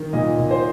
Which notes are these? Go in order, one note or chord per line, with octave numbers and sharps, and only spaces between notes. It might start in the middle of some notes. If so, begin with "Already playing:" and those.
Already playing: D#3
A#2 D#5
A#2
C5